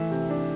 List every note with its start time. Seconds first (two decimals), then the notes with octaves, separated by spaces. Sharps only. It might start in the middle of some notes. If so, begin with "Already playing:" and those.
Already playing: E3 A3 E5
0.11 C3
0.30 D4